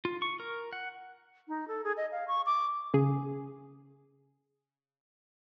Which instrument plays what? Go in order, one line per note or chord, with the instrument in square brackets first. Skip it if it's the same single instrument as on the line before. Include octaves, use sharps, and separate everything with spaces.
[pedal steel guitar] F4
C#6
A#4
F#5
[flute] D#4
A4
G#4
D#5
F5
C#6
D6
[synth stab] C#3 G#4